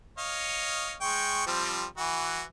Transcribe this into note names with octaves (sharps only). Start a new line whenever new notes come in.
C#5 D#5 F5
G#3 G5 C#6
F3 G3 C4
E3 F#4